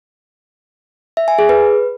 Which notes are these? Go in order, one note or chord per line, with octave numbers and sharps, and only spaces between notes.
E5
G#5
G#4
B4